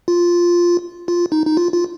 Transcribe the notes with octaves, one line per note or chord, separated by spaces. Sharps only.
F4
F4
D#4
D#4
F4
F4